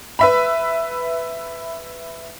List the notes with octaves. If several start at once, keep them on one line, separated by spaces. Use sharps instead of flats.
B4 E5 B5